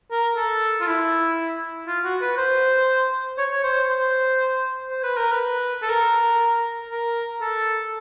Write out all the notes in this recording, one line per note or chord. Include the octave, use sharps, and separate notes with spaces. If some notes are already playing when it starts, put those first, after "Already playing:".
A#4
A4
F4
E4
F4
F#4
B4
C5
C#5
C#5
C5
C5
C5
B4
A#4
B4
A4
A#4
A#4
A4